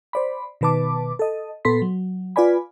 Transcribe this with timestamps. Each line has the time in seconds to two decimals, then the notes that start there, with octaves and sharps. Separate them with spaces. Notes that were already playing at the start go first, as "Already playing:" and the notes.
0.13 C5 D5 B5
0.61 B2 D#3 B4 A5 D6
1.19 A4 D#5
1.65 A#2 B3 A4 C6 B6
1.82 F#3
2.36 F4 B4 D5 G#5 B5